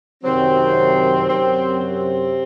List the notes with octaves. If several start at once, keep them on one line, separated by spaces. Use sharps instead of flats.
F#2 C3 D#3 F#3 C4
F#2 C3 F#3 C4
C3 C4